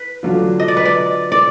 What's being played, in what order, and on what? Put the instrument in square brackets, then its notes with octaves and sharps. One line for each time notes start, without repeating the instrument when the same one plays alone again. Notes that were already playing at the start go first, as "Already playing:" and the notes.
Already playing: [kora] B4
[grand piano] D3 F#3 D4 F4
[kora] D#5
D5
B4
D5
D5